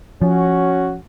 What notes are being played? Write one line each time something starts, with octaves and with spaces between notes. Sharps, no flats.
F3 C#4 F#4